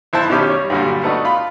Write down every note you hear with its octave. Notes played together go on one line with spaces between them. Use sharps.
B1 E4 C5 A5
B1 B2 D#3 C#4 G4 D6
G3 C#5
G2 A#2 D3 F#3 G3
A3 B3 D4 D#4 F#4
F4 B5